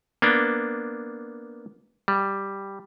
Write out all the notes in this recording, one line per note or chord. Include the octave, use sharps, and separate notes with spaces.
A#3 B3 D4
G3